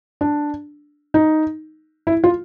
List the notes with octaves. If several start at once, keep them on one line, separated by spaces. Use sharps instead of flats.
D4
D#4
E4
F4